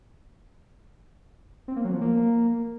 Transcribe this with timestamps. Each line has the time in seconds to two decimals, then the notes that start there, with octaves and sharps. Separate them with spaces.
1.68 C4
1.76 A#3
1.85 F#3
1.93 F3
2.01 A#3